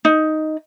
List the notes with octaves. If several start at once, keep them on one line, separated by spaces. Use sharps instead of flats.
D#4